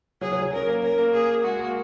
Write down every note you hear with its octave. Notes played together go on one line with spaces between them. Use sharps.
F#3 G#4
F#3
F#3
C#4 A#4
A#3
C#4 A#4
A#3
A#3 G#4
G#3 F#4
A#3